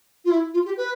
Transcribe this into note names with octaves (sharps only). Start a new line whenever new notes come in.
F4
E4
F4
G4
B4